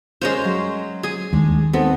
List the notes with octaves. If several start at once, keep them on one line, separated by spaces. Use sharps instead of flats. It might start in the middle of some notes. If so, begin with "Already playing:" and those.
G#3 C#4 F4 A#4 C5
F#3
G#4 G#5
D#2 G#3 D4
B3 C4 D#4 A4